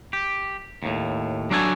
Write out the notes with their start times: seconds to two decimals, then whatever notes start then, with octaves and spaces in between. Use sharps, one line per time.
0.13 G4
0.83 D#2 A2
1.51 F#3 D4 F#4 A4 G#5